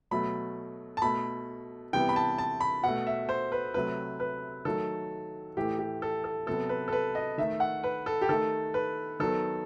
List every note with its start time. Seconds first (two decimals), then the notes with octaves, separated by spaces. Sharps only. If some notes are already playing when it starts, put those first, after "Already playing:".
0.11 B2 F#3 A3 B5
0.97 A5
1.02 B2 A3 B5
1.93 C3 E3 G3 B3 G5
2.09 B5
2.16 A5
2.38 A5
2.60 B5
2.84 B2 A3 F#5
3.07 E5
3.29 C5
3.52 B4
3.74 C3 F#3 A3 B4
4.20 B4
4.65 D#3 F#3 A3 A4
5.57 A2 E3 A3 G4
5.79 G4
6.02 A4
6.24 A4
6.47 C3 F#3 B3 A4
6.69 B4
6.88 A4
6.92 B4
7.15 D#5
7.38 D#3 A3 E5
7.60 F#5
7.84 B4
8.06 A4
8.22 G4
8.29 D#3 A3 A4
8.74 B4
9.20 D#3 F#3 B3 A4